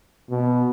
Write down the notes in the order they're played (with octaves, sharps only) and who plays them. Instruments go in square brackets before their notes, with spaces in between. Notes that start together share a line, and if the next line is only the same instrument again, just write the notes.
[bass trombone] B2